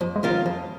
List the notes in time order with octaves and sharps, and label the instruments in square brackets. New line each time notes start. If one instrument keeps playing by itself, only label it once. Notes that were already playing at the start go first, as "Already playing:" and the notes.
[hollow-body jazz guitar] F2 [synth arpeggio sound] F3
[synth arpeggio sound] G#3
[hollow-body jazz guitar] D#3 C#4 F4 A#4
[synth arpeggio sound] F3
[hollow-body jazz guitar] F2 [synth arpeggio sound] F3